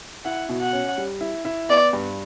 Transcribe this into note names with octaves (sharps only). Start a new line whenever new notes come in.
E4 F#5
B2
F#5
C#4
G3
E4
E4
B3 D5
G2